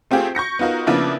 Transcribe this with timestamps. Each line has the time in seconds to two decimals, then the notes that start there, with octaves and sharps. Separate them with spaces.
0.11 A3 C4 F4 G4 G#4
0.35 C#6 G6 A#6 C#7
0.59 B3 D#4 F4 F#4 A#4
0.87 C#3 F3 A#3 B3 D4 E4